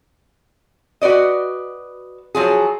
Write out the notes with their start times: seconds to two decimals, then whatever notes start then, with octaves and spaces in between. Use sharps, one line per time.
1.02 F#4 B4 D5 D#5
2.35 F3 F#3 F4 G#4